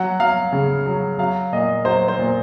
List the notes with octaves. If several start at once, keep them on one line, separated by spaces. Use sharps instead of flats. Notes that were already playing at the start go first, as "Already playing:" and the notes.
Already playing: F#3 F#5
F#3 F5
C#3
F#3
F#3 F5
A#2 D#5
F#3 C5
C5
A#2